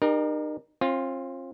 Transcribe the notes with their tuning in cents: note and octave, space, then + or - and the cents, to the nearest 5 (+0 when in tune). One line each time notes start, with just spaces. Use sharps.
D#4 -40 G4 +30 A#4 +15
C4 +40 F4 +0